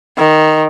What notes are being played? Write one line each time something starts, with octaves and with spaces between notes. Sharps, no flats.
D#3